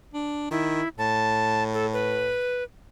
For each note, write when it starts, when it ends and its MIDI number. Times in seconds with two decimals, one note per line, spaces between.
0.14 0.47 62
0.51 0.82 51
0.51 0.88 64
0.98 2.39 45
0.98 1.63 81
1.73 1.86 69
1.93 2.64 71